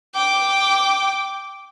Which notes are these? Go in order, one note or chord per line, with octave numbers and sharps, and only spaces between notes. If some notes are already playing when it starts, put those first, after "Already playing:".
G5 D6